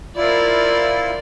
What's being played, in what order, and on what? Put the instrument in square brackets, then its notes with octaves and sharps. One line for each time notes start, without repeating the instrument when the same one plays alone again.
[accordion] E4 F4 [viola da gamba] A#4 C5 D5